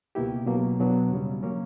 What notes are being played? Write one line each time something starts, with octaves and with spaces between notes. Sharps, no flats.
C#2 B2 A#3 E4 G4
B2 F#3 A#3
E2 B2 F#3 B3 D4
E2 C#3 G3 C#4
C#3 F#3 A#3 C#4